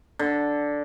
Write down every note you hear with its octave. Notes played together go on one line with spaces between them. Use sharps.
D3